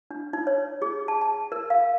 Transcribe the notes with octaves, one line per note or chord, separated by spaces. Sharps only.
D4
D#4
C#5
G#4
A5
A5
A#4
F5